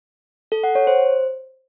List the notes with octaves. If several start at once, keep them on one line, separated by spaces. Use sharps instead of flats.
A4
F#5
C#5
C5